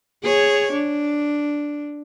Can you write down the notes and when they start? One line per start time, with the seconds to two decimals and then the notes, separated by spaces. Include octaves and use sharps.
0.23 G#4 C#5
0.72 D4